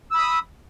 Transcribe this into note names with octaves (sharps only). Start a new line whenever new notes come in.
B5 D#6 E6